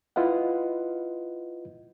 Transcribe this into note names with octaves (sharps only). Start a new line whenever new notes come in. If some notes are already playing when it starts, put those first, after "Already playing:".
E4 F4 B4 D#5 F#5